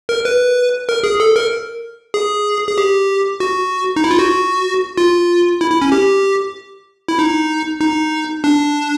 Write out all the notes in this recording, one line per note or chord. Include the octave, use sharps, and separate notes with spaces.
A#4
B4
A#4
G#4
A4
A#4
G#4
G#4
G4
F#4
D#4
E4
F4
F#4
F4
E4
E4
C#4
G4
E4
D#4
D#4
D4